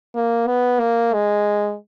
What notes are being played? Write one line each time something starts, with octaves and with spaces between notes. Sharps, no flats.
A#3
B3
A#3
G#3